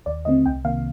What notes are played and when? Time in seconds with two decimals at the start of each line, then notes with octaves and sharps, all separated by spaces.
0.06 D#2 D5
0.25 D3 A3 C4 D#5
0.45 C2 G5
0.65 C3 D#3 A#3 F5